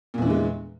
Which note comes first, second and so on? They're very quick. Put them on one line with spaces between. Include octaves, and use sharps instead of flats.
A#2 E2 E3 D3 G#3